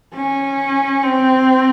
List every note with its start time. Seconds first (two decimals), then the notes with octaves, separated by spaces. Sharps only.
0.14 C#4
1.03 C4